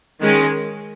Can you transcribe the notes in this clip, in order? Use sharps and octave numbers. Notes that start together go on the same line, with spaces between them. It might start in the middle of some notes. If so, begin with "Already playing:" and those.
D#3 G#3 C#4